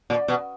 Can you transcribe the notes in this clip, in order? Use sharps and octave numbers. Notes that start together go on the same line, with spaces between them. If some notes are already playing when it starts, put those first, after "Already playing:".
A#2 D5
B2